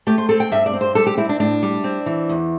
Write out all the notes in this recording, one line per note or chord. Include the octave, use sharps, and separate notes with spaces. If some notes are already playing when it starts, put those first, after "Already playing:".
A3 G4
C5
C4 A4
G5
G2 E5
D5
C4
C5
G3 A4
G4
C4 E4
D4
A2 D4
G3
C4
E3
E2